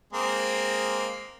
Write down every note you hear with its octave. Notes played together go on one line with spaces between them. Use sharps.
G#3 A#3 C4